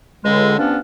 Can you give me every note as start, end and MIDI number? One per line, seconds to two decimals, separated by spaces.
0.25 0.56 37
0.25 0.56 50
0.25 0.56 56
0.59 0.78 43
0.59 0.78 53
0.59 0.78 59
0.59 0.78 61
0.59 0.78 62